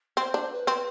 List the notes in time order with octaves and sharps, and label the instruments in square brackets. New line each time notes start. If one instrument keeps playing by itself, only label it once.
[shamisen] C4 [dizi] C5
[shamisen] D4
[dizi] B4
[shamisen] C4